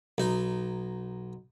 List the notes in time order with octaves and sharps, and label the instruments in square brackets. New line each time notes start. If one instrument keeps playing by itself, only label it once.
[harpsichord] B1 D#4